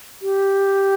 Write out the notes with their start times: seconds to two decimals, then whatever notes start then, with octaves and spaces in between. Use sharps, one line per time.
0.22 G4